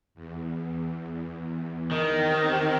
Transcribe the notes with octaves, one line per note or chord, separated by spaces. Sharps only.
E2
D#3
C4 G4